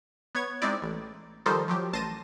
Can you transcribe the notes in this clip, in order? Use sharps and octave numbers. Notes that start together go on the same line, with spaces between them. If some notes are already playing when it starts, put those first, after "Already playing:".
B3 C#5 G#6
G#3 C4 D#4 E4 D5
A1
D#3 F3 G3 D#4 A4 C5
F3 F#3 G4
A1 A5 C6 A#6 D#7